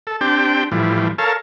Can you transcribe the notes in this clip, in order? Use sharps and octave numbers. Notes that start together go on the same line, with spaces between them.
A4
C4 D4 G4 G5
A2 E3 F3 G3
A4 A#4 C#5 F5 A5